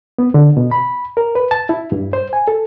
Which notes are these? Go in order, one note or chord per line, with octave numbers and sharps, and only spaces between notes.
B3
D3
B2
B5
A#4
B4
A5
E4
G2
C5
G#5
A4